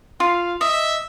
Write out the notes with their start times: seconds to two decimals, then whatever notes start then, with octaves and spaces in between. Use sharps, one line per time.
0.20 F4 F5
0.61 D#5 E5